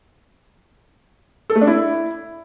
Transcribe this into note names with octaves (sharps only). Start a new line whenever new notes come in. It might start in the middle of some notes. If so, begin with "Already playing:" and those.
A4
A3
D4
E4